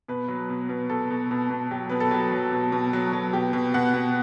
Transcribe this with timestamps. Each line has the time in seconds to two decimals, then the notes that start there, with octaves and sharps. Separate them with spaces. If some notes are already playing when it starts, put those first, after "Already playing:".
0.08 B2 B4
0.28 F#3
0.50 B2
0.69 B2
0.90 B2 A4
1.10 B2
1.31 B2
1.50 B2
1.71 F#3 G4
1.89 B2 B4
2.00 A4
2.11 F#3 G4
2.32 F#3
2.52 B2
2.72 B2
2.93 F#3
3.13 F#3
3.33 B2 G4
3.53 B2
3.74 B2 F#5
3.94 B2